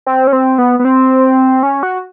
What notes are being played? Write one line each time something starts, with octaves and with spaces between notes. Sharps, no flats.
C4
C#4
C4
B3
B3
C4
C#4
F#4